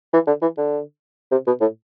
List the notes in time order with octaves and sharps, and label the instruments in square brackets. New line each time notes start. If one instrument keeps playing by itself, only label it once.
[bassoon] E3
D3
E3
D3
C3
B2
A2